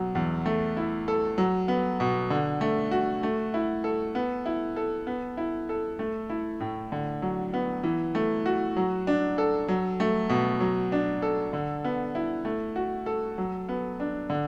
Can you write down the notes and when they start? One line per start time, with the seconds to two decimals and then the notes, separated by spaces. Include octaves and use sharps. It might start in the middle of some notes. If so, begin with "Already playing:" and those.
Already playing: B2 F#3
0.15 E2
0.46 A3
0.77 E4
1.08 A4
1.38 F#3
1.68 B3
2.00 B2
2.30 D3
2.61 A3
2.91 F#4
3.23 A3
3.54 E4
3.84 A4
4.15 B3
4.46 E4
4.76 A4
5.07 B3
5.37 E4
5.69 A4
5.99 A3
6.30 E4
6.60 A2
6.92 D3
7.22 F#3
7.54 B3
7.84 E3
8.15 A3
8.46 F#4
8.77 F#3
9.07 D4
9.38 A4
9.68 F#3
10.00 A3
10.29 B2
10.60 F#3
10.92 D4
11.22 A4
11.53 D3
11.84 B3
12.15 E4
12.45 A3
12.76 F#4
13.06 A4
13.38 F#3
13.69 B3
14.00 D4
14.30 D3